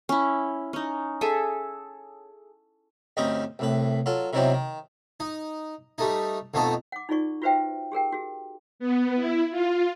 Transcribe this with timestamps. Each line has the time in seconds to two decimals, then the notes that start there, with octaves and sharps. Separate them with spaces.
0.09 C#4 E4
0.73 C#4 D#4
1.21 G#4 A4 E5 G#5
3.17 D2 G2 C4 C#4 D#4 D#5
3.59 C2 A2 B4
4.06 F#3 F4 A4
4.33 C3 D#3 E3 F#3 B3 C4
4.54 D#3
5.20 D#4
5.98 G3 A3 D#4
6.54 F2 B2 A3 D#4 A4
6.92 F#5 D6
7.09 D#4 F4 G#4 D5 C#6
7.42 F4 F#4 B4 C5 E5 G5
7.92 G4 G#4 A#4 G5
8.12 F#4 G#4
8.79 B3
9.16 E4
9.51 F4